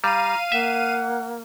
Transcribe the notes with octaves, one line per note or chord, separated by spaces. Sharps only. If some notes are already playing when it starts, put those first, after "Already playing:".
G3 F5 A#5 D#7
A#3 E5 F#5